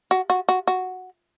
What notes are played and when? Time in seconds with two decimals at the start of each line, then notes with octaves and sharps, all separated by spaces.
0.11 F#4
0.30 F#4
0.49 F#4
0.67 F#4